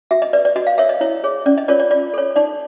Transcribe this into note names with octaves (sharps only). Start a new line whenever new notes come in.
F#4 E5
D#5
B4 D5
D5
F#4 D#5
F5
A#4 C#5 E5
D#5
E4 C#5
G#4 C#5
C#4 D5
D#5
F4 A#4 C#5 D5
D5
F4 D5
A4 C#5
D#4 D5